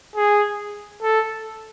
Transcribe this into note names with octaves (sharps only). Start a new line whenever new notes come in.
G#4
A4